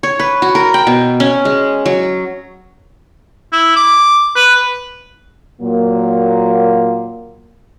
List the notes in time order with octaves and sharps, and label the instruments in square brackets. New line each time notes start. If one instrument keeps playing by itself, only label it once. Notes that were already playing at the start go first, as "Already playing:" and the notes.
[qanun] C#5
B4
F#4
A#4
G5
B2
C#4
G#3
F#3
[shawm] E4
D6
B4
[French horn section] A#2 F#3 A#3